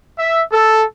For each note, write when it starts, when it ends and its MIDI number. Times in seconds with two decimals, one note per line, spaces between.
0.18 0.41 76
0.51 0.83 69